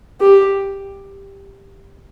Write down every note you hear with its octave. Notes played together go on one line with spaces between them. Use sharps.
G4